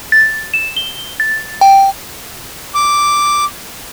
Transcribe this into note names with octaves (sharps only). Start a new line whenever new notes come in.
A6
E7
G7
A6
G5
D6